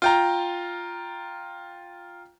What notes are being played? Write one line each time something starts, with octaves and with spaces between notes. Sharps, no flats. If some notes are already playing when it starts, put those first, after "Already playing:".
F4 G5 A#5